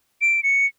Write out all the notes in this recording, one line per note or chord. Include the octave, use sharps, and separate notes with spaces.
D7
C#7